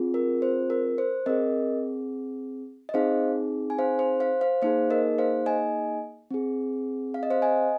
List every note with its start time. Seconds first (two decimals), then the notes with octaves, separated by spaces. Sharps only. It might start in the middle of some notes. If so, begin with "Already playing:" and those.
Already playing: C4 F4 G#4
0.14 A#4
0.42 C5
0.70 A#4
0.98 C5
1.26 C4 G#4 A#4 D#5
2.89 D#5
2.94 C4 D#4 G#4 C5 F5
3.70 G#5
3.79 C5 F5
3.99 C5
4.20 C5 F5
4.41 C5 F5
4.62 A#3 D#4 G#4 C5 F5
4.90 A#4 D#5
5.18 C5 F5
5.46 D#5 G#5
6.31 C4 G#4
7.14 F5
7.23 D#5
7.30 C5 F5
7.42 D#5 G#5